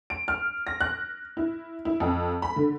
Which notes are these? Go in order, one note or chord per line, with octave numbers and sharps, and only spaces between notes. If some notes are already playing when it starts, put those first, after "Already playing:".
D7
F6
A#6
F#6
E4
E4
F2
B5
D3